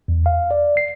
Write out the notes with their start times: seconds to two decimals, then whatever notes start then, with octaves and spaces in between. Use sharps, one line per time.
0.08 E2
0.26 F5
0.51 D5
0.77 C7